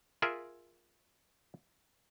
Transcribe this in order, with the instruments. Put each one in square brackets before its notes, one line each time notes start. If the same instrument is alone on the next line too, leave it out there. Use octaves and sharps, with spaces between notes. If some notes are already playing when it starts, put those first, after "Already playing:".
[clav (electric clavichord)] F4 G#4 A#4 E5